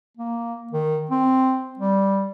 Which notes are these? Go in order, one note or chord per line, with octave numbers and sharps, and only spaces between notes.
A#3
D#3
C4
G3